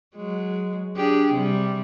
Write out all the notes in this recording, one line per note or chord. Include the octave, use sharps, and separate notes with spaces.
F#3 G#3
D4 G4 G#4
C3 G3